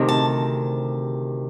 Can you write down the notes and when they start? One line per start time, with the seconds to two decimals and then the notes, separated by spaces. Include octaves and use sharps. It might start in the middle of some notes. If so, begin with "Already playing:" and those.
Already playing: D2 C3 D#3
0.09 A5